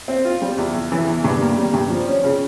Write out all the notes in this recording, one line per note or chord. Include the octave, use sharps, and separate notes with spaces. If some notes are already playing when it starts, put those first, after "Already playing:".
C4
F4
G3
E2
E2
E3
E2
G2
A#3
G3
G2
F3
C#4
C#3